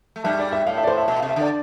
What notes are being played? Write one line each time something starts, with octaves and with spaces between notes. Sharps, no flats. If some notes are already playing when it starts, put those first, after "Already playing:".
A3
G2 G3 E5
D5
E5
A2 F5
E5
D5
A2 C5
E5
B2 E5
C3 F5
E5
D3 D5